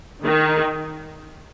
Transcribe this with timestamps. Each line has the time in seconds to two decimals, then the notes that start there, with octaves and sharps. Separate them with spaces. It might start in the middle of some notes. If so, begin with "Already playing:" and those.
0.24 D#3